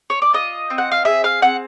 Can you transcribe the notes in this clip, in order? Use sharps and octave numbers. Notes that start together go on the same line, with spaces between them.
C#5
D5
F4 D#5
C4
F#5
F5
G#4 E5
F5
C4 F#5